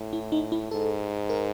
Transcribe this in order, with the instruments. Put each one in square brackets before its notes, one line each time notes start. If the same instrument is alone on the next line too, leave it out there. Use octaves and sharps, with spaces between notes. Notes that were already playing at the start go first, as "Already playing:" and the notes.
Already playing: [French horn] A2
[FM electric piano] E4
D#4
E4
[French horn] G#2 [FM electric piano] A4
[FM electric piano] A#4